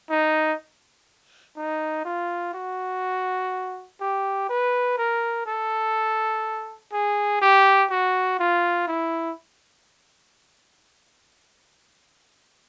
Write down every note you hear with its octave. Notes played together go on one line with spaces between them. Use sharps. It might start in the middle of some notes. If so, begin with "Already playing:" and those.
D#4
D#4
F4
F#4
G4
B4
A#4
A4
G#4
G4
F#4
F4
E4